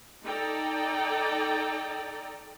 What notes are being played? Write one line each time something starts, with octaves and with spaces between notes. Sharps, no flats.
D#4 A4 D5 G5 A#5